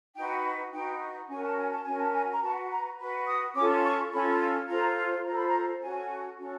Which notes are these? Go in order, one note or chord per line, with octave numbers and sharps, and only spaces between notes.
D#4 F#4 B4 G5
D#4 F#4 B4 G5
C#4 F#4 A#4 G#5
A5
G#5
A5
C#4 F#4 A#4 G#5
A5
G#5
A#5
F#4 B4 A5
A#5
F#4 B4
D#6
C#4 F4 A4 D6
C#6
C#4 F4 A4 B5
F4 A4 C5 A#5
F4 A4 C5 A#5
B5
A#5
C#4 F#4 A4 G#5
C#4 F#4 A4